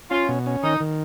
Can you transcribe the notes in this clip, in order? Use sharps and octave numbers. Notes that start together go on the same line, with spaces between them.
C#4 F4
B2
C#4
D#3 D#4
D#3